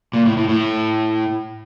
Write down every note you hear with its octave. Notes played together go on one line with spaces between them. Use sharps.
A#2
A2
A2
A2